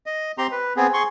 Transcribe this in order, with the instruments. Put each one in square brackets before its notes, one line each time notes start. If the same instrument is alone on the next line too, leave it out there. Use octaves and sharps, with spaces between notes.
[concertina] D#5
C4 G4 A#5 C6
B4
B3 C4 G#4
G#4 C6 C#6